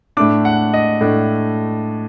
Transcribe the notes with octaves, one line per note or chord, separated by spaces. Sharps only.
A2 A3 D4 D6
F#5
D#5
A2 A3 D4